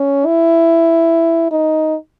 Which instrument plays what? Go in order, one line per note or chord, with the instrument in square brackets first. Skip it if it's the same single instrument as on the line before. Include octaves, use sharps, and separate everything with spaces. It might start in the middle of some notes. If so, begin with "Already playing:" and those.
Already playing: [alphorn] C#4
E4
D#4